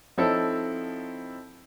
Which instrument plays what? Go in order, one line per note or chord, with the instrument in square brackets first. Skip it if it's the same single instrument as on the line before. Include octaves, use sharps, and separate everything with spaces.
[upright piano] F3 C4 D#4 E4 A4 C#5